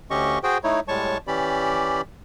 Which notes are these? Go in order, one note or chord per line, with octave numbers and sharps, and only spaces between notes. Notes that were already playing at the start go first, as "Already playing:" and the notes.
D2 D3 C#4 G4 D#5 C#6
F#4 G#4 C5 G5
A3 D#4 E4 C#5
A2 G3 G#3 C#5 A5 C#6
E3 C#4 G4 D5 B5